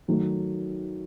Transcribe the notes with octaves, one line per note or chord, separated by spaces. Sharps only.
D#3 F#3 A3